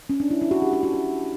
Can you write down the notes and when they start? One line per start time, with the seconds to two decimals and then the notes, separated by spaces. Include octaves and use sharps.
0.10 C#4
0.20 D4
0.31 E4
0.41 E4
0.51 F#4
0.62 G4
0.73 F#4
0.83 F#4
0.93 F#4